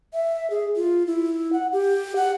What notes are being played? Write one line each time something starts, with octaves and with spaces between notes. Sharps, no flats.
E5
G#4
F4
E4
F#5
G4
F#5